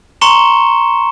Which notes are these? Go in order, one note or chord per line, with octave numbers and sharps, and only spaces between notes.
A#5 C6 C#6 C#7 E7 G7